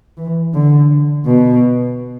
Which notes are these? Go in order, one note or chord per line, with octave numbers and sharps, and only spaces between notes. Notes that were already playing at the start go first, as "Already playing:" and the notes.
E3
D3
B2